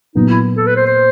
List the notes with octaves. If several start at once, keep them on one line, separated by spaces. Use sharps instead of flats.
A#2 F#3 B3 D#4
E4
A4
B4
C5
C5